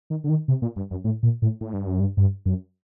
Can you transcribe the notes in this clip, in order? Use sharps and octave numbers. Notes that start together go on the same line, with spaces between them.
D#3
D3
D#3
C3
A#2
G2
F#2
A2
A#2
A2
A2
G2
F#2
G2
G2
F#2